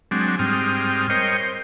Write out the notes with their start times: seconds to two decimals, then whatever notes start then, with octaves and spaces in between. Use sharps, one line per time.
0.11 F#3 G#3 C4 D4
0.39 G#2 G3 C4 D#6 F6
1.10 A#4 C5 C#5 D#5 G5
1.40 C5